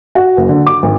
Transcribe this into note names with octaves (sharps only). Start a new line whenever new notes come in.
F#4
F#1
D3
D6
G#1